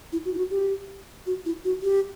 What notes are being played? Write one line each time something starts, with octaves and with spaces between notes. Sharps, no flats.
E4
F#4
E4
F#4
G4
F#4
E4
F#4
G4